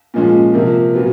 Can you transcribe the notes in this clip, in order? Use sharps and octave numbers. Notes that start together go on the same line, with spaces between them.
A#2 F3 G#3 C#4
C3 F3 A#3
A#2 F#3 B3